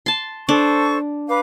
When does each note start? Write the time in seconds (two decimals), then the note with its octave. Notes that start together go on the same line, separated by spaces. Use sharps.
0.06 A5 C6
0.49 D4 A4 C5 C#6
1.29 B4 F5 D6